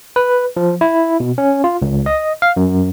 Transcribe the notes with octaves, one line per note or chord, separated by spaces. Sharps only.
B4
F3
E4
B2
C#4
F4
C#2
D#5
F5
F#2